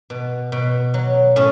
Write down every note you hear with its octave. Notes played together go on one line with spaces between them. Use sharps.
B2
B2
F#3
A2 C#4